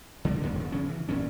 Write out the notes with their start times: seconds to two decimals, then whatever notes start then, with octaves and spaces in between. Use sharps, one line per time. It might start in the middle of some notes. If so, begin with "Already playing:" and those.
0.25 D3 G#3 D4
0.42 F2 A#2 D3 B3
0.55 E1 D#3
0.72 C#3 F3 C#4
0.89 E3
1.09 E1 A#2 G3 C#4